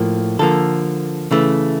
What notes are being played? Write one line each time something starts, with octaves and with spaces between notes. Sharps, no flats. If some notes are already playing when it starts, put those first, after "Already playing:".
Already playing: A2 F3 A#3
D3 F3 A#3 A4
C#3 E3 A3